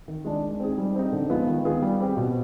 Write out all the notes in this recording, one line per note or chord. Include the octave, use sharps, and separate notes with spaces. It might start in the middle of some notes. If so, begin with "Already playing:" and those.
D#3
G#3 D4
G#3
C4 D#4 G#4
G3
C4 D#4
D3
F3 G#3 B3 F4
D#3
B3 F4 G#4
G3
C4 G4
B2